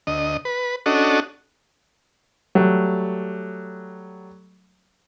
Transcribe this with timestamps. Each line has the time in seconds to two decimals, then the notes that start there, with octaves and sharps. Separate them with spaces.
0.07 D2 D#5
0.45 B4
0.86 C#4 D4 F#4 A4 D#5
2.55 F#3 G3 A3